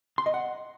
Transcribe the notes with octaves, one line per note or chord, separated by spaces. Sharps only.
C6
D#5
F#5